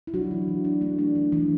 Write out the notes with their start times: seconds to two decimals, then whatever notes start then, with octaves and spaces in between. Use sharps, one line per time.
0.07 E4
0.14 F#3 D4 F#4
0.31 E3
0.48 E3
0.65 D4
0.81 A3
0.99 D4
1.15 E3
1.32 E3